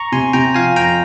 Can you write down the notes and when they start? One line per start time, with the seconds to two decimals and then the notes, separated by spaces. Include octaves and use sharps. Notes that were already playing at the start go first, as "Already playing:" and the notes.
Already playing: A#5 C#6
0.12 C3 G#5 C6
0.33 C3 G5 A#5
0.55 F3 F5 G#5
0.76 F2 G5 A#5